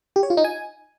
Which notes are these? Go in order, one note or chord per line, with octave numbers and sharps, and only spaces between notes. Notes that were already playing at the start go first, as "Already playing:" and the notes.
G4
C#5
F4
D#4
G#5